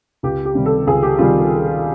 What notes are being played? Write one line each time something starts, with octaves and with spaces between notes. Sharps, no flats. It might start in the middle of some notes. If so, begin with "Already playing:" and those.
C#2 G4
G4
C3 D#3 G3
A4
C#2 G#4
G4
C3 D#3 G3 F4